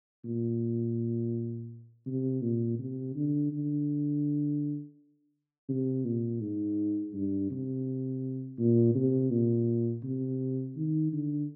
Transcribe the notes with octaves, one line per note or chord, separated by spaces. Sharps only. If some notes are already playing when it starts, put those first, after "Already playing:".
A#2
C3
A#2
C3
D3
D3
C3
A#2
G#2
G2
C3
A#2
C3
A#2
C3
D#3
D3